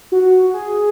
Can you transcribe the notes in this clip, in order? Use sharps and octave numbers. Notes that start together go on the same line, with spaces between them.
F#4
G#4